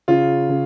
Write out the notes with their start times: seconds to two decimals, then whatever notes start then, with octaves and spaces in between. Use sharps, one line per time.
0.08 C#3 F4
0.49 C#3